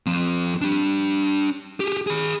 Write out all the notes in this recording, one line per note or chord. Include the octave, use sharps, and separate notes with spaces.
F3 C4
D4 G4
G4 G#4
G#4 B5